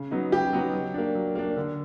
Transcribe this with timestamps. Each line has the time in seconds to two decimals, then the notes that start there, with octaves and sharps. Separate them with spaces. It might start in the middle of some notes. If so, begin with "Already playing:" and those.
Already playing: C#3
0.11 F#3 B3 D#4
0.32 C#3 G4
0.53 F#3 B3 D#4
0.73 F#3
0.94 A#3 D4
1.15 F#3
1.35 A#3 D4
1.57 D3